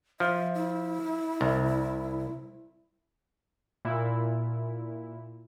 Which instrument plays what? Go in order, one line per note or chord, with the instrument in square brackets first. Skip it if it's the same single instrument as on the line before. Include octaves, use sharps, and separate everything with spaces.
[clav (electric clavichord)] F3 [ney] E5
[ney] E4
[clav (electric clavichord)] C2
[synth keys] A#2 E4